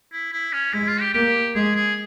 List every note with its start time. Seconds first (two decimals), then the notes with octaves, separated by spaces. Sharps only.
0.13 E4
0.33 E4
0.53 C#4
0.73 G#3 E4
0.87 F4
1.01 G4
1.14 A#3 G4
1.55 G#3 G#4
1.76 G#4